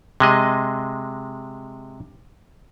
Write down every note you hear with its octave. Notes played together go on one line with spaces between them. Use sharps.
C3 G#3 D#5